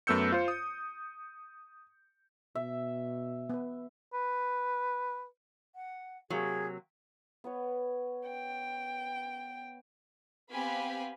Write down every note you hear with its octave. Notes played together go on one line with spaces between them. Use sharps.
F#2 A3 B3 E6 G6 C#7
F4 C5
D#6
B2 E5
B3 B4
B4
F#5
C3 F#3 A#3 G#4
B3 B4 C#5
G5
B3 C4 G4 F5 G#5 B5